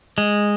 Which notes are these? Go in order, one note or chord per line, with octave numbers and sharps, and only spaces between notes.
G#3